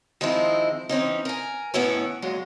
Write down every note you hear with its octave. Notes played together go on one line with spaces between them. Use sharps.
D#3 F3 G#3 C4 D#4 E4
E3 C4 C#4 D#4
A#4 G#5
A2 D#3 B3 C#4 E4 C#5
A#2 F#3 G#3